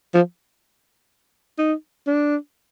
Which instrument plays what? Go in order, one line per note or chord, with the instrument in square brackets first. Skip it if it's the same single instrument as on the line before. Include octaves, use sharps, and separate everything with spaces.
[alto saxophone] F3
D#4
D4